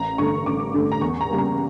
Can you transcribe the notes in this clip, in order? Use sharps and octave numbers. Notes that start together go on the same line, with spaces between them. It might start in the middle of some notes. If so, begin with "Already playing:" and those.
Already playing: A1 A#5
G2 D3 A3 C#6
A1 D6
G2 D3 A3
A#5
E2 C#6
A#5
C#3 G3 A#3
A#5